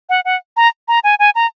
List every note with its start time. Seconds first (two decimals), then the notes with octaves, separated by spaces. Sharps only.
0.09 F#5
0.25 F#5
0.57 A#5
0.88 A#5
1.04 G#5
1.19 G#5
1.35 A#5